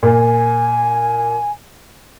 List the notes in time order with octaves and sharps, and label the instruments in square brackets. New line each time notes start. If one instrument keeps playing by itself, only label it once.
[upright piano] A#2 [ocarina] G#5